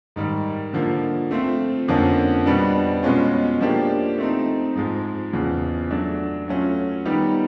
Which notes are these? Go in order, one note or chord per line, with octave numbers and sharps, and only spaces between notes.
G#2 D#3 G3
D3 F3 A#3
A3 C4 F4
F2 D3 F3 A#3 C#4
B2 G3 B3 D4
B2 G#3 C#4 F4
F3 A#3 D4 G4
A3 C4 D#4
G#2 F3 G#3
E2 C#3 F3
F#3 A3 D4
F#3 A3 C#4 F4
D#3 G3 B3 D#4 G4